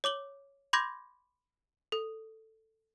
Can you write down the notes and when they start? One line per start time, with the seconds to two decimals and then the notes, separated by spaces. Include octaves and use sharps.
0.04 C#5 D6 F#7 G7
0.73 B5 C6 D6 G6 G#6 A#6
1.92 A4